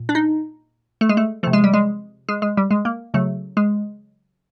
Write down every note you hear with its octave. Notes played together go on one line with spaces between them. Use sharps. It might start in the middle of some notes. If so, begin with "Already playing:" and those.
Already playing: A#2
D4
D#4
A3
G#3
A3
C3 F3 A3
G#3
G3
G#3
G#3
G#3
G3
G#3
A#3
C#3 F#3 A3
G#3